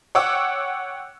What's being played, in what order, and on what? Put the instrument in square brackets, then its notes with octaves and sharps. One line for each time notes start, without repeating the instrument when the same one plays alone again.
[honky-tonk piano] C#5 F#5 G5 D6 E6